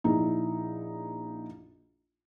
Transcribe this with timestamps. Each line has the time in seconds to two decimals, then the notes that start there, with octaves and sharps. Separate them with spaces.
0.04 A#1 D#4 E4